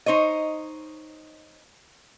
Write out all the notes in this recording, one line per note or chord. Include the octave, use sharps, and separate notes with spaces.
D#4 C5 C#5 D#5